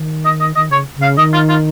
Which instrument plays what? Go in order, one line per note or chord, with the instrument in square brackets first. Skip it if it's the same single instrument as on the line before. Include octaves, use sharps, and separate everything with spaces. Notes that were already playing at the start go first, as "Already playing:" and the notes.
Already playing: [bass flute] D#3
[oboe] D#5
D#5
[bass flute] D#3 [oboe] D#5
[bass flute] C#3 [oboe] C#5
[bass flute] C#3
[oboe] F5
[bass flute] D#3 [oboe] D#5
[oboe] F4
F4